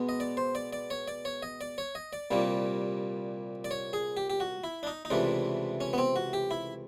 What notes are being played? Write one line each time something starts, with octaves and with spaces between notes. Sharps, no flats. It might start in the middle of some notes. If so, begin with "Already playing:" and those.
Already playing: B2 G#3 B3
D#5
D5
C5
D5
D5
C#5
D5
C#5
D#5
D5
C#5
D#5
D5
C2 A#2 G3 A#3
D5
C#5
G#4
G4
G4
F#4
E4
D4
D#4
D#4
C#2 C3 E3 A3 D4
C#4
B3
C4
F#4
G4
E4